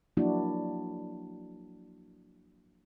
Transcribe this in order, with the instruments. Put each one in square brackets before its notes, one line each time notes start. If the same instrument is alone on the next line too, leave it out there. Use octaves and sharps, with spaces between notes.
[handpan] F3 F#3 A#3 D4 E4 F#4